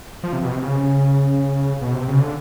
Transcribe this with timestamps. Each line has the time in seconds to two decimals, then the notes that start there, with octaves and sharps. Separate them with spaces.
0.23 F3
0.33 C3
0.43 B2
0.52 C3
0.62 C#3
1.82 B2
1.94 C3
2.08 C#3
2.21 D3